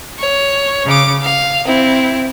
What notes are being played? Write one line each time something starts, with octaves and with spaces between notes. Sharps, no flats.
C#5
C#3 D6
F5
C4 E4